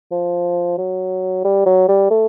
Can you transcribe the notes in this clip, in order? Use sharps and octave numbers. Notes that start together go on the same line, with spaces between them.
F3
F#3
G3
F#3
G3
A3